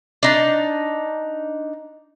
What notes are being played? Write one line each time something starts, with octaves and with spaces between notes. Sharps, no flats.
D4 D#4 A5